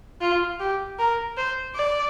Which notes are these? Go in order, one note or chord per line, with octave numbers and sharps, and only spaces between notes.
F4
G4
A#4
C5
D5